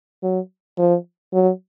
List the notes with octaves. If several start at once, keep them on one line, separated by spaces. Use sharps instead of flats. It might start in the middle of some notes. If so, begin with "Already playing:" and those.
F#3
F3
F#3